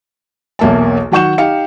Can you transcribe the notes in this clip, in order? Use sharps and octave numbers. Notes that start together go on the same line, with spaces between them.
B1 E2 A#3 E5 A5
D#3 F#3 F#5 C#6 G6 E7
D#4 G4 F5 G5 C#7